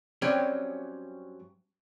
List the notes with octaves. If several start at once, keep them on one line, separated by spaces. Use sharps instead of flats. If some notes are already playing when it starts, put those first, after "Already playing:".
G2 F#3 C4 C#4 D5